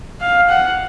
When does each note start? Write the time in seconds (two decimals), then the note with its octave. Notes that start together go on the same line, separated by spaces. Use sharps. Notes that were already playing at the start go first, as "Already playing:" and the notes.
0.21 F5
0.49 F#5